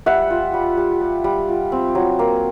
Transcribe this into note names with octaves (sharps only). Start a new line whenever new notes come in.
G3 E5 F#5
F4
G3
G3
G3
G3
F4
C4
F#3
A#3